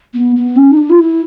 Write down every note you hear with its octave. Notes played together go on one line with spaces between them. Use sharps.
B3
B3
C#4
D#4
D4
F4
E4